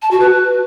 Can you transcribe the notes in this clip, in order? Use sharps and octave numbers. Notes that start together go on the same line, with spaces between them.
A5
F#4
B4